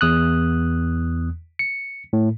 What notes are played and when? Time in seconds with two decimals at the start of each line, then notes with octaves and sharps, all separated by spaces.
0.01 E2 D#6 F#6
1.59 C#7
2.13 A2